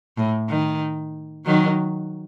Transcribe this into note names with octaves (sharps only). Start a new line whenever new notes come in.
A2
D#3
D#3 F#3